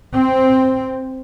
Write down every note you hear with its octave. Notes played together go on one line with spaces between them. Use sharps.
C4